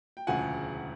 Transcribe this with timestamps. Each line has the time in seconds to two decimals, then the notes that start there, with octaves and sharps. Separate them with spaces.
0.17 G5
0.27 E1 D2 C#3 F3 F#5 G#5